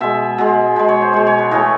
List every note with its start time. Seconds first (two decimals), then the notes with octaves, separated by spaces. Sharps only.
0.01 B2 G#3 E5
0.38 B2 G#3
0.76 B2 G#3
0.89 C#5
1.02 C5
1.13 B2 G#3 C#5
1.27 C#5
1.39 B4
1.51 A2 E3 A3 D#5